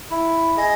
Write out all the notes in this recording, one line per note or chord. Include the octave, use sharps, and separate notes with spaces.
E4
G#4 D#5